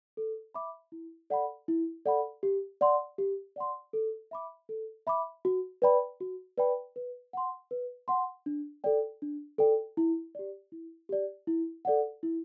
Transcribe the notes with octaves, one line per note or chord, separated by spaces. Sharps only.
A4
E5 B5 D6
E4
A4 D5 F#5 B5
E4
A4 D5 F#5 B5
G4
D5 F#5 C6
G4
D5 F#5 C6
A4
E5 B5 D6
A4
E5 B5 D6
F#4
B4 D5 G5 B5
F#4
B4 D5 G5 B5
B4
F#5 C6
B4
F#5 C6
D4
A4 D5 G5
D4
A4 D5 G5
E4
G4 D5
E4
G4 D5
E4
A4 D5 F#5
E4